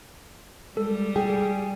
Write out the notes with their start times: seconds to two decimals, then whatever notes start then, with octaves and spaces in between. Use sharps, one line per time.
0.77 G3 G#3 A4
1.16 G#4 G5